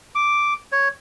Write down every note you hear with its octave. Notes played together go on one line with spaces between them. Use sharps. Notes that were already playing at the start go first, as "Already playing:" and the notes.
D6
C#5